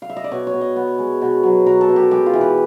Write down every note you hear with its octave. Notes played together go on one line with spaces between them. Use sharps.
F5
E5
D#5
D5
B2 C#5
C#5
B2
D#5
B3
G#3
B2
F#3
B2 A#4
A4
B2
G4
G#3 G4
F4
E3
B4